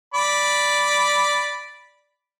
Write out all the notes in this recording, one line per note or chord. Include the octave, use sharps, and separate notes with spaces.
D5 B5